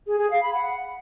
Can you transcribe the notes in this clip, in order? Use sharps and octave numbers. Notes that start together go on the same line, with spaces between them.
G#4
G#4
F5
B5
F#5